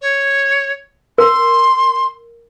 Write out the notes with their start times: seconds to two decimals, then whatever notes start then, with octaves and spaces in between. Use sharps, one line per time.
0.02 C#5
1.18 A#4 C6